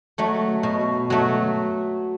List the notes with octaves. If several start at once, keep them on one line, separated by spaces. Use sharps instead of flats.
F#3 A3
B2
F#3 A3